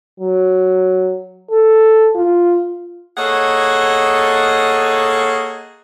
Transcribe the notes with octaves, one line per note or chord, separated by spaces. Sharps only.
F#3
A4
F4
A#3 G#4 A4 C#5 D#5 F#5